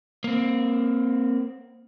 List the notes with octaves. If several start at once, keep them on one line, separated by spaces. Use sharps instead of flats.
A#3 C4